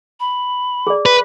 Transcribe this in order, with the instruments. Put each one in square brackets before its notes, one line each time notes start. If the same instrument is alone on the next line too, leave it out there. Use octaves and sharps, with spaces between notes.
[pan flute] B5
[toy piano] G#4 D5
[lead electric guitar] B4